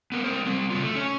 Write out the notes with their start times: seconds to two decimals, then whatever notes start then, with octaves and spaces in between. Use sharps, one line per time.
0.12 B3 A#4 B4
0.24 C4 A#4 C5
0.45 G3 C4
0.70 C#3 F#3 F4
0.83 A3
0.95 C#4 C#5